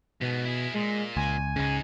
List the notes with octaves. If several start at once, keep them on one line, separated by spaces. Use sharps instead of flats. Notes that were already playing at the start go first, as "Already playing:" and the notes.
G#2 B2 B3
E4 G#4
A#2 G#3
C#2 G#5
C#2 G#2 C#3 D#4